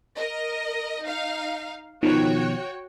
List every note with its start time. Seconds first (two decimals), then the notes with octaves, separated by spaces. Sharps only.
0.17 A#4 D#5
1.02 D#4 F5
2.03 B2 D#3 F3 F#4 C#5 G5